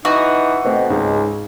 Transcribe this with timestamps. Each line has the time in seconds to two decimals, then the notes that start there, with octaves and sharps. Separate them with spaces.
0.05 E3 D#4 F#4
0.65 B2 A3 C4 C5 D#5
0.90 C#2 G#2 D#4 G#4